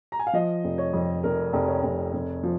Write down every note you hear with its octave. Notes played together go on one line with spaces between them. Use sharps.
A#5
G#5
F5
F3 D#5
F1
C#5
F2
F1 A#4
F1
C#5
F1
F1
F3